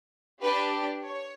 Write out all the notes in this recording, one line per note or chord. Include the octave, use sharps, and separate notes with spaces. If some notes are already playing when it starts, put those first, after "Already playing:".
D4 G4 B4
C#5